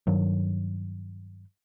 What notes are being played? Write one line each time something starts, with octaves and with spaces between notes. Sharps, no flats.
G2 D#3 F#3